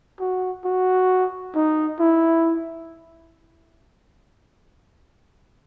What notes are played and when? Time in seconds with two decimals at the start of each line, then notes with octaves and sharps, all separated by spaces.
0.20 F#4
0.65 F#4
1.55 D#4
2.00 E4